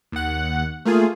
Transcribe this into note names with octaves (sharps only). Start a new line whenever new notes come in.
D#2 F#5
A3 A#3 F4 G#4